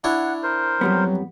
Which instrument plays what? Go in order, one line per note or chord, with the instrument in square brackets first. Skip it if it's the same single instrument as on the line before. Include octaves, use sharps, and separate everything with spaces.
[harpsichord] D4 E4 C#5 [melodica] F#5
[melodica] A#4 C5
[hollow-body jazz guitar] F2 G3 B3 [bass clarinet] F#3